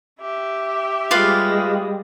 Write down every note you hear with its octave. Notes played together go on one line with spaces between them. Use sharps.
G4 E5
G3 G#3 F4 B4 F5